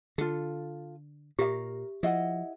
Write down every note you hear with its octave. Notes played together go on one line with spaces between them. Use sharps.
D3 F4 A4
A#2 G4 A#4 E5
F3 E4 D#5 F#5